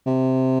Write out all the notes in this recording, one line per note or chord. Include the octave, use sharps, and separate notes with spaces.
C3